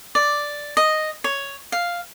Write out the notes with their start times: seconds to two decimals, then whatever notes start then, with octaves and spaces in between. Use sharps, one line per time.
0.15 D5
0.77 D#5
1.24 C#5
1.72 F5